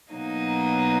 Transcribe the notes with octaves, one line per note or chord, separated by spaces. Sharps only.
B2 F#3 A#3 D#4